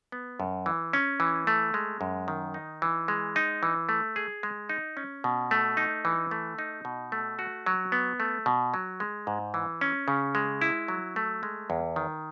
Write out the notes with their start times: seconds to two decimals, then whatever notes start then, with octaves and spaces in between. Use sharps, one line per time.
0.12 B3
0.40 F#2
0.66 E3
0.93 C#4
1.20 E3
1.47 A3
1.74 G#3
2.01 F#2
2.28 D#3
2.54 D#4
2.82 E3
3.08 G#3
3.36 D#4
3.63 E3
3.89 A3
4.16 G#4
4.43 G#3
4.69 D#4
4.97 C#4
5.24 B2
5.51 A3
5.77 D#4
6.05 E3
6.31 A3
6.59 D#4
6.85 B2
7.12 A3
7.39 F#4
7.66 F#3
7.92 B3
8.20 A3
8.46 B2
8.74 F#3
9.00 G#3
9.27 G#2
9.54 E3
9.81 C#4
10.08 C#3
10.35 G#3
10.61 E4
10.88 F#3
11.16 A3
11.43 G#3
11.70 E2
11.96 D#3